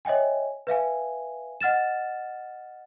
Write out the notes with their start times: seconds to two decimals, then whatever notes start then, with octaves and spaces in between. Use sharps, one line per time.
0.05 C#5 D#5 E5 G5 G#5
0.67 B4 E5 F5 G#5
1.61 D#5 F#5 F6 A6 E7